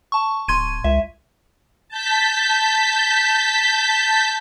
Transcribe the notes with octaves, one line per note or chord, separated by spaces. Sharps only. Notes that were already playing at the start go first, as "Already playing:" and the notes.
A5 C#6
D1 C6 G#6 D#7
C#2 E5
A5 G6 B6